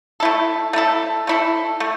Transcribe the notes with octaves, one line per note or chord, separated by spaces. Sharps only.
A3 E4 A4
A3 E4 A4
A3 E4 A4
A3